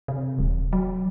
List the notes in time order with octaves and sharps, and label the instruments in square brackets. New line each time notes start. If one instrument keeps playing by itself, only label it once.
[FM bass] C3
D#1
F#3